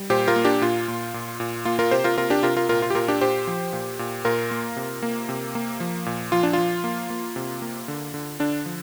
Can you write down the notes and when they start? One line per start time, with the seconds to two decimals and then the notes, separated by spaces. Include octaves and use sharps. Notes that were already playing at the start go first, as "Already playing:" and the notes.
Already playing: G3
0.10 A#2 G4 C5
0.28 F4 A#4
0.36 A#3
0.45 D4 G4
0.61 A#2 F4
0.88 A#2
1.14 A#2
1.40 A#2
1.65 A#3 F4
1.79 F4 A#4
1.91 C3 G4 C5
2.04 F4 A#4
2.17 C3 F4 A#4
2.30 D4 G4
2.43 C3 F4 A#4
2.57 F4 A#4
2.69 A#2 F4 A#4
2.82 F4
2.90 G4
2.95 A#2 F4 A#4
3.08 D4 G4
3.21 A#2 G4 C5
3.47 F3
3.73 A#2
3.99 A#2
4.25 A#2 F4 A#4
4.51 A#3
4.77 C3
5.03 A#3
5.29 C3
5.55 A#3
5.80 F3
6.06 A#2
6.32 F3 F4
6.43 D4
6.53 F3 F4
6.84 A#3
7.10 A#3
7.36 C3
7.62 A#3
7.88 D3
8.14 D3
8.40 D3 D4
8.66 F3